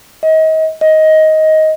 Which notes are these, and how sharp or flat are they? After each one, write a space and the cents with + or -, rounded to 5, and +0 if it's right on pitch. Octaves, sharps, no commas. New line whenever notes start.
D#5 +35
D#5 +15